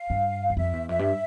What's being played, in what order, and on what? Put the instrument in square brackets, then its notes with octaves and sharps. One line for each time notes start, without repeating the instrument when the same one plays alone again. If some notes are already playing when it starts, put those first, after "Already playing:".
Already playing: [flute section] F5
[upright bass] G2
E2
[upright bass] F2 [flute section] E5
[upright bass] E2
[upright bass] F2 [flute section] E5
[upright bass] G2